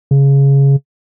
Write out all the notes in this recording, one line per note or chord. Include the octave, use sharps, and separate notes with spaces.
C#3